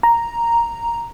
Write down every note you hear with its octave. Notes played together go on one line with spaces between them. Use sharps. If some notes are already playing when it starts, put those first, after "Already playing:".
A#5